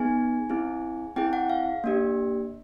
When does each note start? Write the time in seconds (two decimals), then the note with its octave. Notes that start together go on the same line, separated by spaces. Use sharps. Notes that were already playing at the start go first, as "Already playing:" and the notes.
Already playing: B3 D#4 G#4 G#5
0.50 C4 E4 G#4
1.16 C4 E4 G#4 G5
1.33 F#5
1.49 F5
1.84 A#3 D4 G4